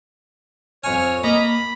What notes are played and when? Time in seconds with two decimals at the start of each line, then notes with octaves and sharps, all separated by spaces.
0.84 F2 C#5 G#5 F6
1.24 A#3 D#5 A#5 B5
1.40 B5